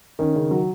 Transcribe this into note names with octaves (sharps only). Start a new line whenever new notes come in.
D#3 C#4
C#3
F#3